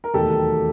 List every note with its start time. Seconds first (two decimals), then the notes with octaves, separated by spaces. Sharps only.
0.04 A#4
0.14 E1 D#2 D#3 F#3 A3 G4 A4